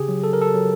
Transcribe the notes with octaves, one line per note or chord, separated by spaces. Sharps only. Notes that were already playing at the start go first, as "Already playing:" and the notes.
Already playing: C#3 G4 G#4
F#3
A4
A#4
A4
F#3